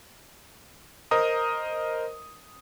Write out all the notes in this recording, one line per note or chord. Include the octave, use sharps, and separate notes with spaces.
A#4 C5 D#5 A#5 D#6